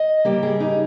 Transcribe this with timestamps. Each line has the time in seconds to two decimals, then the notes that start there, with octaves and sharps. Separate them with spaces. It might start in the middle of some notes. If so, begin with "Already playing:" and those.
Already playing: D#5
0.25 C#3 G3 A#3 G4
0.43 G#4
0.60 D#4